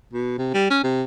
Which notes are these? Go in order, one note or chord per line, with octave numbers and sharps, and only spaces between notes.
B2
C3
G3
C#4
C3